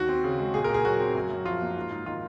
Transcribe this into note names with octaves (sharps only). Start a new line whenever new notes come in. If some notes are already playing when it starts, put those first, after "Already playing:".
Already playing: D#2 F#4
C4
C#3
G#3
A#2 G#4
A#2 A#4
G#4
F#3 F#4
C4
F#2
F#2
F3 F4
A#3
G#2
G#2
D#3 F4